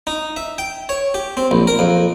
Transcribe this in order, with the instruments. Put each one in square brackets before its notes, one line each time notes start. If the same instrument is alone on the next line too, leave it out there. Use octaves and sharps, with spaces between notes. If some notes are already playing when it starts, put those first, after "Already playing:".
[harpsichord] D#4
E5
G5
C#5
G4
C4
A#1
A#4
F2